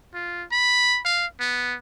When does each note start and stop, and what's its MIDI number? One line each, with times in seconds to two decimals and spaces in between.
0.14 0.44 65
0.52 1.00 83
1.05 1.26 77
1.40 1.76 59